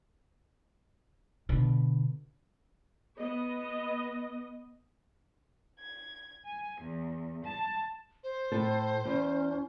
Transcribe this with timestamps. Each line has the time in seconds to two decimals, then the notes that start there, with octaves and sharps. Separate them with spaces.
1.49 B2 D3
3.19 B3 D#5
5.79 G#6
6.44 G#5
6.80 E2
7.44 A5
8.24 C5
8.52 A2 A4
9.05 E2 C#4